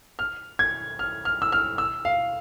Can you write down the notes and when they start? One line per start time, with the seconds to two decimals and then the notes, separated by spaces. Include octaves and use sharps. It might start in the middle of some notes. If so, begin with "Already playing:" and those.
0.19 F6
0.59 G#6
0.99 F6
1.25 F6
1.42 E6
1.52 F6
1.78 E6
2.05 F5